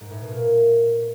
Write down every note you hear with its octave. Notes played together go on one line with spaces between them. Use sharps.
G#2
A2
B2
A#2